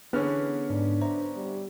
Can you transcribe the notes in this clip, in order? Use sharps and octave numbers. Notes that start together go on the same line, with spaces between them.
D3 E3 B3 C#4 G#4 F6
G#2 D4
C5 E5 A#5
G3